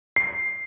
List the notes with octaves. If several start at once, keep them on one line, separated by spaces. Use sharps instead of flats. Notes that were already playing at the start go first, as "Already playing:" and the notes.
C7